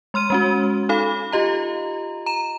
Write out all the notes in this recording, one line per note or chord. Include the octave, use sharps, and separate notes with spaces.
G#3 C6 F6 D#7
G#3 C#4 F#4
D#4 A4 F5 B5
F4 G4 D#5 A#5
A#5 E7